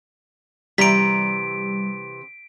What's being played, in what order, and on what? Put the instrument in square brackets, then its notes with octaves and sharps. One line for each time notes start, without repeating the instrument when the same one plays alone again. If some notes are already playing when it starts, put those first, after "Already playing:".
[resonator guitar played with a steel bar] C3 E3 A#5 [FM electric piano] G3 [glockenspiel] B6 D7